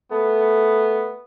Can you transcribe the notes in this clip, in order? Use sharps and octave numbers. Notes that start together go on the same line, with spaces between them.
A3 B3